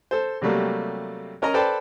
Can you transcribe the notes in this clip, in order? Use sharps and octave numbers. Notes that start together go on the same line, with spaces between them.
A4 C5
C3 F#3 G3 A3 A#3
C#4 A#4 D#5 A#5
A4 B4 C5 D5 G5 A5